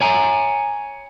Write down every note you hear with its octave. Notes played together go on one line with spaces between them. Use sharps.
C#5 G#5 A#5